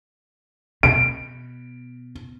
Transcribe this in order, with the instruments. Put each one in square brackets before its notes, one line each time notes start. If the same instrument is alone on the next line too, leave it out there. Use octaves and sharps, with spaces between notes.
[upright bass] B2 [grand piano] D7